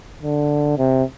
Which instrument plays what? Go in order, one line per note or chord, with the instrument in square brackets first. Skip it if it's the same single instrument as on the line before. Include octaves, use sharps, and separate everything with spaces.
[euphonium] D3
C3